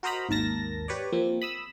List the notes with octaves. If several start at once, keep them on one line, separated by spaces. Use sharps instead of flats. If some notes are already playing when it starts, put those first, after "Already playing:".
F#4 A#4 C5 D#5 A#5 B5
G#1 D#2 A#4 A5 A#6
G4 B4 C#5 D5
F3 A#3 C4
B5 D#6 E6